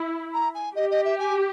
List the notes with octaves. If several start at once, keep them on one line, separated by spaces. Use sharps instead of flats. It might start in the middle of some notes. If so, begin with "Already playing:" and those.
Already playing: E4
A#5
G#5
G4 D#5
D#5
E5
G#5